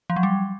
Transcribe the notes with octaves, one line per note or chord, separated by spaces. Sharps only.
F3
F#3
G3